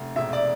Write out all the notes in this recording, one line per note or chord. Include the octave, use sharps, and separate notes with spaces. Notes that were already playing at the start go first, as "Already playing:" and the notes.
Already playing: F1
E1 E5
D5